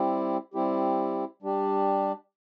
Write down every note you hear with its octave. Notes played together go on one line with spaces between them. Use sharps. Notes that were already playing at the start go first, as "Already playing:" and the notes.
Already playing: G3 C4 E4 G4
G3 C4 E4 G4
G3 D4 G4